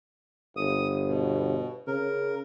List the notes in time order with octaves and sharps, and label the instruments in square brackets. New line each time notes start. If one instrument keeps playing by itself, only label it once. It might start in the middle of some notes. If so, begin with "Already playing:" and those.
[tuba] G1 [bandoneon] D#6
[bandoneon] B2
[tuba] C#3 [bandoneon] A#4